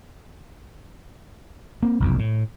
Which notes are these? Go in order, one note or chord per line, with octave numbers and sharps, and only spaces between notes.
A#3 C4
F1 B1 F#2
A2